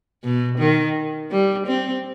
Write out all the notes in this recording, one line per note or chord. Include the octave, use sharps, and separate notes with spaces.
B2
D#3
G3
C4